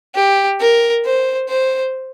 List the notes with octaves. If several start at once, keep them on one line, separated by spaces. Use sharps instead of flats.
G4
A#4
C5
C5